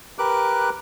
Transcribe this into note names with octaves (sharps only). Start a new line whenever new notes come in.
G4 A#4 B4 D6 F#6